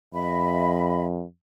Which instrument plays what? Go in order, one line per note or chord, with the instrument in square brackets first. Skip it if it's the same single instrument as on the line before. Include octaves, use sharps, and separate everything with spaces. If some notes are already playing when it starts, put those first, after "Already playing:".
[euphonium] F2 [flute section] D#5 E5 B5